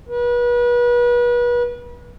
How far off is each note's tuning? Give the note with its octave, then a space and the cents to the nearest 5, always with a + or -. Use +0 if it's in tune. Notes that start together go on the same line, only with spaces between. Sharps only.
B4 -35